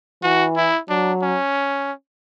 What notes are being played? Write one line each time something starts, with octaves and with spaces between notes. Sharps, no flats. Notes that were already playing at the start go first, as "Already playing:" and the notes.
E3 F#4
E4
F#3 D4
C#4